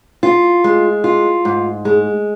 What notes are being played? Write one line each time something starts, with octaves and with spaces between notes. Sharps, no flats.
F4
G#3
F4
G#2
G#3